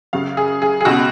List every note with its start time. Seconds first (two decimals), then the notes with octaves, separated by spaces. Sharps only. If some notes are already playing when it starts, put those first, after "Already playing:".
0.13 F#2 C#3 F5
0.37 G#4
0.62 G#4
0.81 G#4
0.85 C#2 B2 F#4